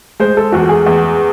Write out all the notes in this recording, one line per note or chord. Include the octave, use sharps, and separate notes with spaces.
G#3 C5
A4
E2 F#4
G#4
E2